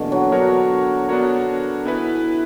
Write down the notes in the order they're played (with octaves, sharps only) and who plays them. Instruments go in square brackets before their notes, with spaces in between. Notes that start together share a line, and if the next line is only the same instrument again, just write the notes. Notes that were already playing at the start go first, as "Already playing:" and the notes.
Already playing: [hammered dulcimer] B2 D3 [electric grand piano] E3 G3 A#3
[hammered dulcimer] F#3
[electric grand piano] B3 D4 F#4 A#4 C#5
B3 D4 F#4 A#4 C#5
[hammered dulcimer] E3 [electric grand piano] B3 E4 B4